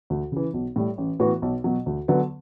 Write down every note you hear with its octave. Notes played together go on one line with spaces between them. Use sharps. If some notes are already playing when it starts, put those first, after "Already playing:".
D2
C#3 E3
B1
A2 G3
A1
A2 E3 B3 F#4
B1
B2 F#3
D2
D3 F#3 B3